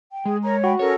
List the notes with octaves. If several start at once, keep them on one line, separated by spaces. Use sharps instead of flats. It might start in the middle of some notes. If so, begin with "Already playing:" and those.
G5
G#3 G#4
A#4 C#5 A#5
F#4 G5 B5
C#4 A4 A#4 C#5